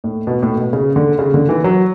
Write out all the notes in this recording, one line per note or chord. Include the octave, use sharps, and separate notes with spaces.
A2
B2
A2
B2
C#3
D3
C#3
D3
E3
F#3